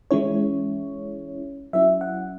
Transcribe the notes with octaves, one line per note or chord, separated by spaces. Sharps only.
E3 G#3 C#4 E4 C#5
F#3 C#4 E4 E5
F#5